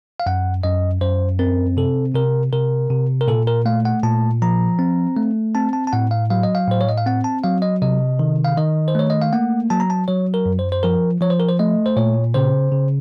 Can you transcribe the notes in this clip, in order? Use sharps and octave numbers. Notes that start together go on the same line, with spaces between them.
F5
F#2 F#5
F#2 D#5
F#2 C5
C4 A#4
C3 A4
C3 A#4
C3 A#4
C3
A#4
A#2 A4
A#4
A3 F5
F#5
A#2 A5
F3 A#5
C4
A3
C4 A5
A5
A5
A2 F#5
F5
F#3 F5
D#5
F5
A2 C5
C#5
D#5
F5
C4 F#5
A5
F#3 F5
D#5
C3 D#5
D#3
F5
D#3 D#5
C5
A3 C#5
D#5
F5
A#3 F#5
F#3 A5
A#5
A5
F#3 C#5
A#4
F#2
C5
C5
F3 A#4
F3 C#5
C5
A#4
C5
A3 D#5
C5
A#2 C#5
C#3 C5
C#3